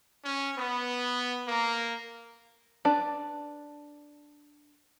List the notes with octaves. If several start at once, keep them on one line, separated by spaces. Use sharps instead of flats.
C#4
B3
A#3
D4 B4 D5